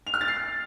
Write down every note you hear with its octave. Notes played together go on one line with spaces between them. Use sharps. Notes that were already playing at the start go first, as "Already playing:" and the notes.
F7
F6
A6
C7